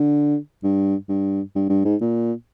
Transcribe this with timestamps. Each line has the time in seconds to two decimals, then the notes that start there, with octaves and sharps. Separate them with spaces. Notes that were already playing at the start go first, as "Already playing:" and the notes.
Already playing: D3
0.64 G2
1.09 G2
1.56 G2
1.69 G2
1.85 G#2
2.01 A#2